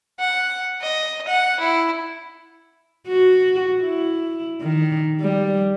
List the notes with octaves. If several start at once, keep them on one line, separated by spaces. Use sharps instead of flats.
F#5
D#5
F#5
E4
F#4
E4
D#3
G3